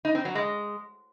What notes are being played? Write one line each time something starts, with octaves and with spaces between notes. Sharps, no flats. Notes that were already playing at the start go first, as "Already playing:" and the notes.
D#4
C4
F#3
G#3